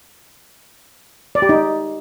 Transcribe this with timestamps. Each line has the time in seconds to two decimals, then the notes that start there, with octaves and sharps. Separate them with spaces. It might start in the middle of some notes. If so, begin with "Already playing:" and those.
1.35 D5
1.42 G4
1.49 D#4